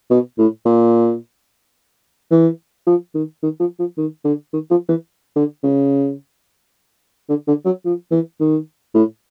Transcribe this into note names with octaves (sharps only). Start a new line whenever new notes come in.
B2
A2
A#2
E3
F3
D#3
D#3
F3
F3
D#3
D3
D#3
F3
E3
D3
C#3
D3
D3
F#3
F3
E3
D#3
A2